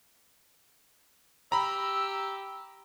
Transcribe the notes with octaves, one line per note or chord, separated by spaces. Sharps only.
G4 A#5 B5 E6